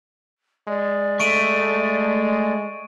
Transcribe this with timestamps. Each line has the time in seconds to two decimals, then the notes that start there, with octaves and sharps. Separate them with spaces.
0.68 G#3 D5
1.20 A3 C#6 D7 D#7